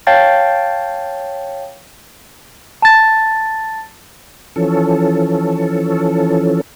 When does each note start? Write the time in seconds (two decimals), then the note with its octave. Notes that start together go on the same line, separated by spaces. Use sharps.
0.07 C#5 F5 G5 A5 G6 A6
2.82 A5 A6
4.56 E3 F3 C#4 A4